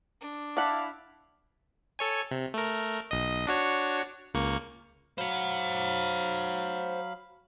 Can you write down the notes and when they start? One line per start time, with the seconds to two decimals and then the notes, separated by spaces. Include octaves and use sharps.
0.21 D4
0.57 E4 D5 F5 F#5 A5
1.99 A4 C#5 G#5
2.31 C3
2.54 A3 A#4
3.11 B1 D#5
3.47 D4 F#4 C#5
4.34 C#2 A#3 C#6
5.18 F#3 C5 F5 F#5 B5